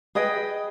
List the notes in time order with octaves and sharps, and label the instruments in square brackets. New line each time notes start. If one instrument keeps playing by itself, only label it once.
[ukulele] G#4 B4 D#5 G5